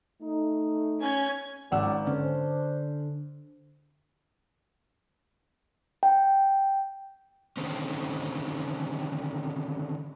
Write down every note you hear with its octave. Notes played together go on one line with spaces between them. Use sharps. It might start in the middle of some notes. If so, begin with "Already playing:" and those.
A3 D#4
C#4 G#6
G#1 C#2 C#4 D5 F#5 E6
D3 C#4 D4 C5
G5
D3 D#3 C4 C#4